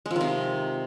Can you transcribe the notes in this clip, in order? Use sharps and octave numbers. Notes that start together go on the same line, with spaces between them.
G#3
F3
D#3
C3